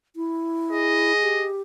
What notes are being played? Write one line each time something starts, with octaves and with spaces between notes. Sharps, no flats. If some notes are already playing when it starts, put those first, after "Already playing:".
E4
G#4 D#5
G4